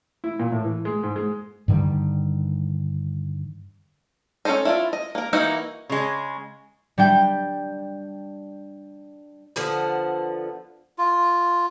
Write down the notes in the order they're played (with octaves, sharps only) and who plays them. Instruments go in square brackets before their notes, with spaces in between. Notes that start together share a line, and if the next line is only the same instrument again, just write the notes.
[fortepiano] E4
A#2
A2
E3
G#3
G#2
G#3
[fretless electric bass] G2 D3 D#3 G3
[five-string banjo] C#4 F4 A4 C5 D#5
E4 F4 D5
D#5
A#3 A#4
E3 A#3 D#4 F#4
[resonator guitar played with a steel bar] C#3 G#3
[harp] G3 D4 G5
[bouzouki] D3 F3 B3
[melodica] F4